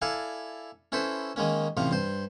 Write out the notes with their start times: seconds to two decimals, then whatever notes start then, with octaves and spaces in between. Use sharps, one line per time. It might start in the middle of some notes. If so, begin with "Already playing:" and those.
0.02 E4 A4 D5 F5 G#5
0.92 C#4 E4 A4 B4 C5
1.36 D#3 G#3 A#3 C#4
1.77 A1 A2 C3 F3 F5
1.91 G2 C5